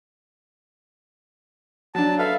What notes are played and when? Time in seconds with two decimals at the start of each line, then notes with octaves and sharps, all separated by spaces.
1.95 F#3 D4 A5
2.18 A4 B4 E5 F5